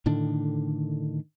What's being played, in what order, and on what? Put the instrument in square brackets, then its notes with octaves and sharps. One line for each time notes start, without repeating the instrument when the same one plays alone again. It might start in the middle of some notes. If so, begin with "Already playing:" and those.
[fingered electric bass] A2 D3 D#3 D4